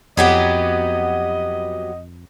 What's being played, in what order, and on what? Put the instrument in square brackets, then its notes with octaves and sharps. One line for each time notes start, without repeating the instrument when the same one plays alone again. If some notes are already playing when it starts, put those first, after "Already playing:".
[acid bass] F2 [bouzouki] F#3 B3 G4 [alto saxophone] D#5